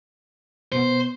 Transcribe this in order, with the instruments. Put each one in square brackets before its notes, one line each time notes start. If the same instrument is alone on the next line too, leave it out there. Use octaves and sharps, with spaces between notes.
[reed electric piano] B2 B3 [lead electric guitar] C5